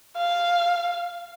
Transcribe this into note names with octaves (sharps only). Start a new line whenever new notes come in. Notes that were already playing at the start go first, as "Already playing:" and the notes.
F5